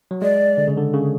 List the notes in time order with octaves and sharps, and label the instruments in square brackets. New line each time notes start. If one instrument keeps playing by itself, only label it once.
[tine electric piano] F#3
[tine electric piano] G#3 [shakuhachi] D5
[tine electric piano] D3
C#3
D3
C#3